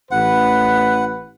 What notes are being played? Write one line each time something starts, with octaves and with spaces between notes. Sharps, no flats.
A1 B4 F#5